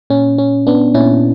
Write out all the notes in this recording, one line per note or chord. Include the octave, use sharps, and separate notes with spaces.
A#2 C#4
C#4
B3 D4
A#2 C#4 E4